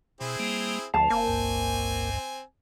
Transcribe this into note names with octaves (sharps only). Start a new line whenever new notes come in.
B2 C4 E4 G#4
G3 A#3
D2 F3 A5
F#1 A#3 C4 G#5
G#1 C#2 G2